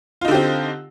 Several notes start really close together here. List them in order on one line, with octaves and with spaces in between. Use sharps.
F4 D#4 D3 G4 C4